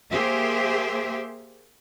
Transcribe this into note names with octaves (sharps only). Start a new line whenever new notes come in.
A#3 G4 G#4 C5 E5